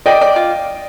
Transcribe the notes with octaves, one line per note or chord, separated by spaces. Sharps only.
D5 D#5 G5
D5
F4